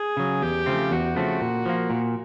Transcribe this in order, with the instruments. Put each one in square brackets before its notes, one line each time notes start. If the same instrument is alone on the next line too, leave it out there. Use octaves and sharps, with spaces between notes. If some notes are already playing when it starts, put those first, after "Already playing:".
Already playing: [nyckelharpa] G#4
[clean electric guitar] C#3 F#3
[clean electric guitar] E2 [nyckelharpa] G4
[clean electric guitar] C#3 F3 A3 C4
[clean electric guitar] E2 [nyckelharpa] F#4
[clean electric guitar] C#3 F3 A3 C4
A#2
F3 A#3
A#2